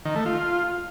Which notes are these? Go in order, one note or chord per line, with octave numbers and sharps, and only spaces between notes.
D#3
A3
F4